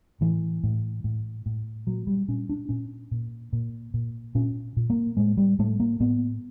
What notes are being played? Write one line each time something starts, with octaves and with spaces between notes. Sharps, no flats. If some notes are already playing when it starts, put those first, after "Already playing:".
A2 E3
A2
A2
A2
A#2 F#3
G3
A#2 C#4
D4
A#2 C#4
A#2
A#2
A#2
A#2 C#4
A#2
A#3
A2 G#3
G3
A2 A3
A#3
A2 B3